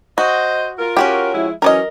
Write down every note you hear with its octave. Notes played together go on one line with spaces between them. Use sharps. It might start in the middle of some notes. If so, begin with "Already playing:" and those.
F#4 C5 D#5
F4 A#4
C#4 F#4 G4
F3 G#3 E4
E3 F#3 C#4 A#4 D5 D#5